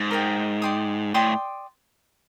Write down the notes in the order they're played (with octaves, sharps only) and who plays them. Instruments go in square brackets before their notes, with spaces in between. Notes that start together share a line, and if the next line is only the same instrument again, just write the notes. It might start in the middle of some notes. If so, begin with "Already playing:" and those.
Already playing: [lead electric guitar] G#2
[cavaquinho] A#4 D#5 G5
D5 G5 C6 D#6
[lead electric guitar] A2 [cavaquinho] D5 G5 C6 D#6